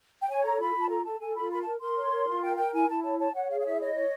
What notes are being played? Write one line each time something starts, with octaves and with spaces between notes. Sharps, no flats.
G5
C#5 G#5
A4 A#5
F4 B5
F4 A5
A4 A#5
A4 A5
A4 G#5
F4 B5
A#4 B5
A#4 A5
A#4 C6
C#5
A#4
F4
A#4 G5
A#4 G5
E4 G#5
E4 A5
C#5 A5
C#5 A5
C#5 F#5
G#4 F5
F5
E4 E5
C#5 D#5
C#5